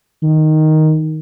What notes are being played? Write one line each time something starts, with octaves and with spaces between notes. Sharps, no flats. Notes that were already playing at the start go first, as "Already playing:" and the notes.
D#3